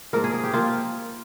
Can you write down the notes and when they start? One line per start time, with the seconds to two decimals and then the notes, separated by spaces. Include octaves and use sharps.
0.13 G#2 F3 A#3 A#4
0.24 G#4
0.34 G#4
0.44 G4
0.53 F3 A#3 F4